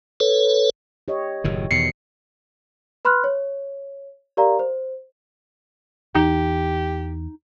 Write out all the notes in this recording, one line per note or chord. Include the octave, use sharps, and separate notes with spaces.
A4 B4 C#5
G4 C#5 D#5
F#1 A2 D#3
E2 B2 D#3 C7 C#7
B4 B5 C6 F6 F#6
C#5
G4 A#4 D5 F5 A#5
C5
E2 E3 D#4 G4